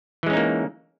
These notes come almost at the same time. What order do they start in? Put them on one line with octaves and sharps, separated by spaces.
E3 G#3 C#4 D#4 A#3